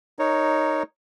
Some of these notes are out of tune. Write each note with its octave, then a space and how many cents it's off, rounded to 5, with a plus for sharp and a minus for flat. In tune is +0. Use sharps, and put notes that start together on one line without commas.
D#4 +0 A#4 -10 C#5 +0